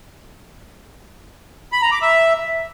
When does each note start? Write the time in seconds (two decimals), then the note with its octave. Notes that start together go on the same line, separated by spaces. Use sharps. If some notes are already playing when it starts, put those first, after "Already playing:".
1.72 B5
1.82 A#5
1.92 D6
2.02 E5